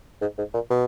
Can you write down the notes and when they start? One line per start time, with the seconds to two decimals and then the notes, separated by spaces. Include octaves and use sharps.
0.21 G#2
0.38 G#2
0.54 A#2
0.70 B2